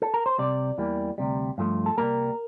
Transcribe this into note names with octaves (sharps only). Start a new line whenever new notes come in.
A4
A#4
C5
C2 C3 G3 D5
E2 E3 G3 A#3
D2 C3 G3
G2 F3 A3
A4
C2 A#2 G3 A#3 A#4